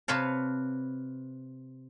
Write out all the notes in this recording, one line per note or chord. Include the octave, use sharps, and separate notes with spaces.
C3 B4 C#5 F5 A5